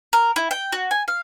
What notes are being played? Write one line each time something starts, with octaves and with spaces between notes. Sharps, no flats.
A#4
E4
G5
F#4
G#5
F5